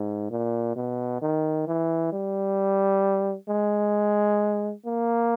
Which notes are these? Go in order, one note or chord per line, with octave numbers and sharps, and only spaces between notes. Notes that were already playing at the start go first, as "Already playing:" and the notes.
Already playing: G#2
A#2
B2
D#3
E3
G3
G#3
A#3